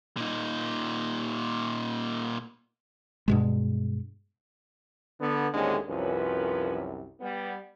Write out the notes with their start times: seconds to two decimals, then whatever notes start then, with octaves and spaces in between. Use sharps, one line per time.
0.17 A#2 D#4
3.28 G2 B2 G#3
5.21 D3 B3
5.53 D#2 A2 D3 G#3 C4 C#4
5.89 C2 F#2 F3 C#4 B4
7.20 G3 B3